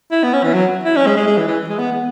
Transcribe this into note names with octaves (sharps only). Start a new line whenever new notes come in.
E4
B3
C#4
E3
F#3
E4
C#4
G#3
G#3
G#3
E3
E3
G#3
B3
B3